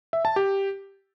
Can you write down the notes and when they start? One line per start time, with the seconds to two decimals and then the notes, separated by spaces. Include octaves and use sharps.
0.13 E5
0.25 A5
0.36 G4